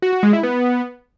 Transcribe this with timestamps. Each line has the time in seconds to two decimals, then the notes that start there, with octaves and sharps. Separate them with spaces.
0.02 F#4
0.13 F#4
0.23 G#3
0.33 E4
0.43 B3